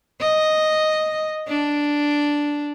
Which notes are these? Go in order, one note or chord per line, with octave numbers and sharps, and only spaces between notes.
D#5
D4